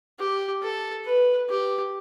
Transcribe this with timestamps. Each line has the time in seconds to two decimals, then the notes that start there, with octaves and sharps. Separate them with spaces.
0.19 G4
0.62 A4
1.05 B4
1.49 G4